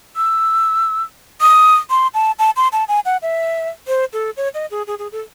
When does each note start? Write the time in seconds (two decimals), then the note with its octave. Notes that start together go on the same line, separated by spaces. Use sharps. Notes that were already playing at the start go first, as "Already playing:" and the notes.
0.16 E6
1.41 D#6
1.90 C6
2.14 A5
2.39 A5
2.56 C6
2.73 A5
2.88 G#5
3.06 F#5
3.22 E5
3.87 C5
4.13 A4
4.37 C#5
4.54 D#5
4.71 G#4
4.87 G#4
4.99 G#4
5.12 A4